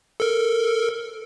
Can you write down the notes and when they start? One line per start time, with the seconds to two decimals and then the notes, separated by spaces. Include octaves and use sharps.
0.20 A4 A#4